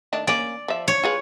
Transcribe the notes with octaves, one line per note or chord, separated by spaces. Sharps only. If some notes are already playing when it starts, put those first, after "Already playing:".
D#3 A3 D4
A#3 C#4 D5
F3 E5
C#5
F4 G#4 B4